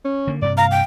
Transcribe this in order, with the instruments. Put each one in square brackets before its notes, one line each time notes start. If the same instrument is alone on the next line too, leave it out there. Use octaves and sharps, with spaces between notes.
[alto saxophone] C#4
[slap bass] D3 A#3
[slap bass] G2 C3 [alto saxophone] D5
[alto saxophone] F5 [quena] A#5
[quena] G5